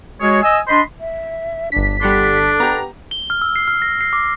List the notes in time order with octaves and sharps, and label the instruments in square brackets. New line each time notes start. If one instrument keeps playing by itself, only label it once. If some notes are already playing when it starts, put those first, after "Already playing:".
[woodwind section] G#3 F#4 G#4 C#5
D#5 G#5 D#6 E6
D4 D#5 B5 C6
[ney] E5
[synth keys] G1 B6 [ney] D4
[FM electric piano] G3 F#5 C6 [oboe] D4 [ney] A4
[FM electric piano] B3 G4 [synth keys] A#5
[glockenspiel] G7
F6
E6
C7
F6
A#6
C7
D6